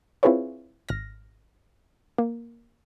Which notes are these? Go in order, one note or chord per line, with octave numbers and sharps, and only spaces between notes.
C4 E4 F4 G#4 B4 C#5
G#1 F6 A#6
A#3